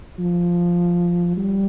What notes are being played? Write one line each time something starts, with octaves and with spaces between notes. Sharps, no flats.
F3
G3